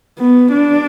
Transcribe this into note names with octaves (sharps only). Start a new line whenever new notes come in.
B3
D4